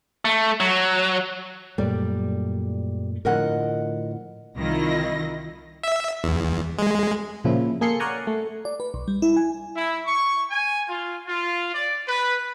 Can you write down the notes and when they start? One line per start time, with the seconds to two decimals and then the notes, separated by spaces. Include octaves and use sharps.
0.25 A3
0.60 F#3
1.78 F#2 A#2 G3 A3 D5
3.25 A2 D3 F3 A#4 D#5 F#5
4.56 C2 D#3 E4 F4 D#5 A#6
5.83 E5
6.24 E2
6.78 G#3
7.44 A#2 C#3 F3 E4
7.81 A#3 G#4 A4 C6 C#7
8.00 A#4 C#5 D5 F#5 G#5 A#5
8.27 A3
8.65 D5
8.80 B4
8.94 B1
9.08 G3
9.22 E4
9.36 G#5
9.77 E4
10.06 C#6
10.50 G#5
10.88 F4
11.27 F4
11.74 D5
12.08 B4